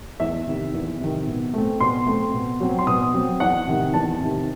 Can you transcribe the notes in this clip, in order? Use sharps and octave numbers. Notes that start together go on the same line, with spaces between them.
E2 E5
C3 D#3
E2
C3 D#3
B2
A3 C4
B2 C6
A3 C4
B2
F#3 C4
C6
B2 D#6
F#3 C4
E2 F#5
C3 D#3
E2 A5
C3 D#3